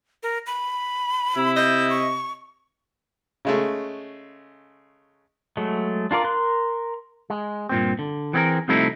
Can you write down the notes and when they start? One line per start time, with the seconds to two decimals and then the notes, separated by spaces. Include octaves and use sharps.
0.23 A#4
0.47 B5
1.36 C3 E4
1.56 D#5 G6
1.90 C#6
3.45 C#3 G#3 A3
5.57 F#3 G#3 A3
6.11 D4 F4 A#4 D5
6.24 A#4 C6 F#6
7.30 G#3
7.69 G2 A#2 C4
7.99 D3
8.33 E3 B3 C4 E4 G#4 A#4
8.68 C2 C3 F3 A3 D#4 E4